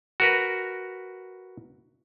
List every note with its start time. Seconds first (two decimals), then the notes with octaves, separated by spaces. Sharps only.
0.20 F#4 A#4 B4